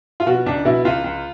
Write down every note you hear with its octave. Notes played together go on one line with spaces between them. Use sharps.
F4
B2 F#4
C#2 D4
B2 E4
C#2 F4
C#2